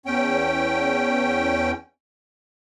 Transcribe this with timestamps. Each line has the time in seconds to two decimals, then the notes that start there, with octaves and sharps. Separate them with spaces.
0.06 E2 C#4 G5